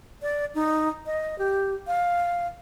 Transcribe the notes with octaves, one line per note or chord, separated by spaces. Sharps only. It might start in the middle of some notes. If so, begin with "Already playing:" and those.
D5
D#4
D#5
G4
F5